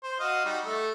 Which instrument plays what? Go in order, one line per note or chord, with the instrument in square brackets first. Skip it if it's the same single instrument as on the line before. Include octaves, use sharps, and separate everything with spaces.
[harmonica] C5
F#4 D#5 F5
G3 D#4 F#4
A3 A4